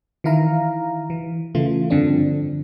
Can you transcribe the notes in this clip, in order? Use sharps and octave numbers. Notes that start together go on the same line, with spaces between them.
D#3 E3 E4 F5 A#5
E3
C#3 E3 A3 F4
G2 D3 F3 C4 D4